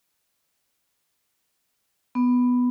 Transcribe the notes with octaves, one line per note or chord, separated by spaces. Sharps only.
B3